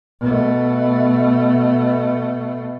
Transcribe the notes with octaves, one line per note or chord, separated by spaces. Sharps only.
B2 A3